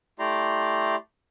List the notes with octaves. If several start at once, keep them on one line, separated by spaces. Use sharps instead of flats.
A3 E4 G4 D5 A#5 C6